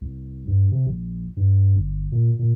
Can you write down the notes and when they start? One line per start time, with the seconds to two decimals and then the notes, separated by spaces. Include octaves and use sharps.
0.01 C2
0.47 G2
0.72 C3
0.87 A#1
1.37 G2
1.76 G1
2.12 A#2
2.39 A#2